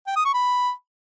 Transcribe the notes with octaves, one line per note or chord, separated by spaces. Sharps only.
G5
D#6
C#6
B5